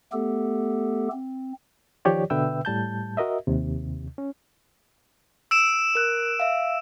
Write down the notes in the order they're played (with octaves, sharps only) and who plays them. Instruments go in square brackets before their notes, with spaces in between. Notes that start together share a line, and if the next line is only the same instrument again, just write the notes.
[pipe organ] A3 B3 G4 A4
C4
[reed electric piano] D#3 F3 G4 C#5 D5
B2 D3 B4 E5 G5 E6
A2 G3 A5 G6
F#4 A#4 D#5 E5
D#2 C3
C#4
[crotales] E6 D7 E7
[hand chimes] A#4 F#6
E5 F5